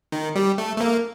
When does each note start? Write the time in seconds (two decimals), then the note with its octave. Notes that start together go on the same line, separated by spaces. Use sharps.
0.12 D#3
0.35 G3
0.58 A3
0.76 A3
0.81 A#3